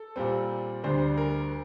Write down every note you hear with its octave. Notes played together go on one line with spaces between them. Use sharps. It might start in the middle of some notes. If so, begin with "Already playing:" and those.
Already playing: A4
A#2 G3 C4
D2 D3 G3 D4 C5
A#4